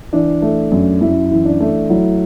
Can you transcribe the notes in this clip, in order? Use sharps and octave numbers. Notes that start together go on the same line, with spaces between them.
E3 D4
A3
F#2
F#2 E4
E3
D4
A3
F#3 E4